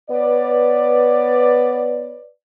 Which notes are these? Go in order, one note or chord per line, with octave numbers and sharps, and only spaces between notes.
B3 B4 C#5 D5